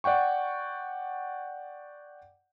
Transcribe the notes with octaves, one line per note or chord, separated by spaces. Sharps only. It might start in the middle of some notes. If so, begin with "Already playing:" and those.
D5 F#5 G5 C#6